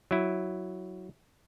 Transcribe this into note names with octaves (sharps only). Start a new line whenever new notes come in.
F#3 E4